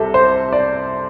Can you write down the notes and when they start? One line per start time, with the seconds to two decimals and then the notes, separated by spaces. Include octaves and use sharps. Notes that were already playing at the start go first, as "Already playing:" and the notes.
Already playing: C2 C3 A4
0.14 C5
0.53 D5